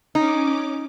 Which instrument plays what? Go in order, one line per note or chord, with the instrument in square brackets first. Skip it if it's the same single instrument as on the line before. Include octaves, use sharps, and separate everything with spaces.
[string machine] C#4 D6 [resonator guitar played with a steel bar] D#4